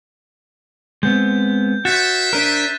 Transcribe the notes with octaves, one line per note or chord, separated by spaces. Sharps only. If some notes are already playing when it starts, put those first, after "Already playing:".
G#3 B3 C4 G6
F#4 C5 E5 F#6 A6 E7
D4 A#4 F6 B6 D#7